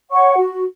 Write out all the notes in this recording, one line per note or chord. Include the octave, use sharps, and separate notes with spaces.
C#5 F#5 C#6
F#4